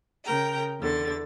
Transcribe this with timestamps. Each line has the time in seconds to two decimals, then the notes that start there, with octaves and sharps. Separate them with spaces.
0.25 C#3 A#4 G5 A#5
0.79 E2 D3 A6